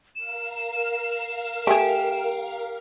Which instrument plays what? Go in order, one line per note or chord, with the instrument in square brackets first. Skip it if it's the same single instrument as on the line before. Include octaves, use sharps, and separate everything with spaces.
[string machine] A#4 F5 [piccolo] E7
[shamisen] A3 G#4 [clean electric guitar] G4